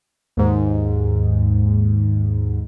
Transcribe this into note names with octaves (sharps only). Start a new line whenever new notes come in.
D#2 G#2